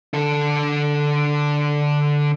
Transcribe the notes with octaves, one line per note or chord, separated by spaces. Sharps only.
D3 A4